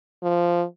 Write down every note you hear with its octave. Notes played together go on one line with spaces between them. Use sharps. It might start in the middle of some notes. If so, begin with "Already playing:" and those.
F3